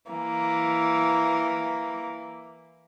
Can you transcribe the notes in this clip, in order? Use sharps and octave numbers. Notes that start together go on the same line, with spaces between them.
E3 A#3